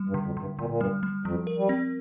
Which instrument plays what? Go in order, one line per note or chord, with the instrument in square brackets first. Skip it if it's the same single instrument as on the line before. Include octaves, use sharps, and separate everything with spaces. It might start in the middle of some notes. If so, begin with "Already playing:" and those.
Already playing: [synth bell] G3
[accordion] G2
[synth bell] D3
[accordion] F2
[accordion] G2 [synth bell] D3
[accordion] A#2 [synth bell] D3
[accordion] A#2
[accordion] G2 [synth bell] G3
[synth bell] G3
[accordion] F2 [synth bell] F3
[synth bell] A#4
[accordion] G3
[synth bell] C4